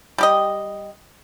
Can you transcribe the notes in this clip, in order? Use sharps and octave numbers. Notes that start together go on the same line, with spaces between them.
G3 G4 D#5